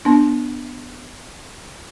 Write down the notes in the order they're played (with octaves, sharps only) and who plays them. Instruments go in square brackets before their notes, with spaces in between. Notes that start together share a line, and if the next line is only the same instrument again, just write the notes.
[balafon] B3 D4